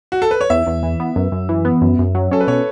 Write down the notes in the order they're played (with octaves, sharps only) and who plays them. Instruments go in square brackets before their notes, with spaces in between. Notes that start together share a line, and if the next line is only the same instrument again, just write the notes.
[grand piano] F#4
A4
B4
C#5
[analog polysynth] E2 [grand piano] E5
[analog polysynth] E2
E3
B3
F#2
F#2
E3
B3
F#2
F#2
F#3
[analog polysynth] C#4 [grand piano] A4
[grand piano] B4
[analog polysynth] B2 [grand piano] C#5